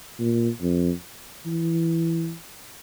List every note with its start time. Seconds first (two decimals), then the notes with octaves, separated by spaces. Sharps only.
0.20 A#2
0.62 F2
1.46 E3